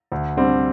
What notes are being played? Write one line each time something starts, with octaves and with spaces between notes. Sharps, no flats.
D2
D3 G3 C4